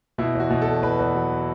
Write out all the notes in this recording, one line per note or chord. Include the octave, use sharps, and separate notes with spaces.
B2 E4
E2 F#4
B2
A4
E2
E2 B4
E2
F#3